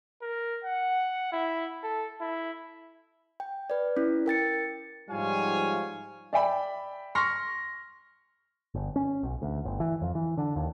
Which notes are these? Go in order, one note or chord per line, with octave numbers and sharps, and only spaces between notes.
A#4
F#5
E4
A4
E4
G5
B4 D5
C#4 E4
A#4 G5 A6 C#7
G#2 F3 G3 C#5 F5 G#5
D5 E5 G5 B5
C6 C#6 F6 A#6
G1
C#4
B1
D2
G1
E3
F2
E3
D3
D#2